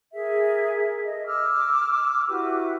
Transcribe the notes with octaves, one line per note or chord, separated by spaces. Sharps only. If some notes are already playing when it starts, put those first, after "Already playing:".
G#4 A#4 E5
A4 D#5
D6 E6 F6
E4 F#4 G4 B4